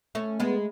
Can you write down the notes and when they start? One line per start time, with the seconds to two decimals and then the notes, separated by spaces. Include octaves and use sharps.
0.15 A3 C#4
0.40 G#3 B3